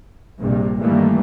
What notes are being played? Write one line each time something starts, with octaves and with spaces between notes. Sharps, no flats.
A#1 G2 C3 G3 A#3
G2 D#3 E3 G3 A3 A#3